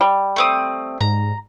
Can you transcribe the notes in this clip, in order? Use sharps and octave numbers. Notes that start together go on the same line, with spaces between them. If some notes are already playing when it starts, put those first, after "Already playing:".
G3
A3 C4 D#6
G#2 A#5